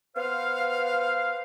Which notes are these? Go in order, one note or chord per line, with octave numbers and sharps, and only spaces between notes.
B3 C5 F5